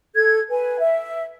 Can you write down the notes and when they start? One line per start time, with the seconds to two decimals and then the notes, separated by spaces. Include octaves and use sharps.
0.14 A4 G#6
0.49 B4 G#5
0.79 E5